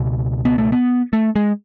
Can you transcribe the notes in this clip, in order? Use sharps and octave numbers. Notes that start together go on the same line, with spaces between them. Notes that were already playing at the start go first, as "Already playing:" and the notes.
Already playing: C#2 B2
B3
A3
B3
A3
G#3